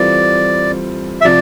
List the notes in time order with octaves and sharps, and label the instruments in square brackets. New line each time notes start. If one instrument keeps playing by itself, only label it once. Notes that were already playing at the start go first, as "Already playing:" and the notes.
Already playing: [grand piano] E3 G3 C4 F4 A4 [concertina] D5
[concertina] E5
[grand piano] C3 F3 [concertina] D5